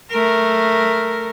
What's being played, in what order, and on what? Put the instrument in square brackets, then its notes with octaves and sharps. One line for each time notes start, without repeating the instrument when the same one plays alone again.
[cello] A3 A#4